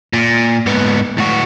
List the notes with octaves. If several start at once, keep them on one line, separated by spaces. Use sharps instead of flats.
A#2
G#2 B3
A2 F#4